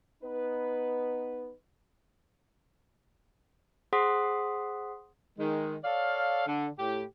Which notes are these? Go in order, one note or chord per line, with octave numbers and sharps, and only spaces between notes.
B3 D#4 B4
G#4 C5 F#5 C6 D#6 B6
D#3 G#3
A4 C#5 D5 F5
D3
A2 G4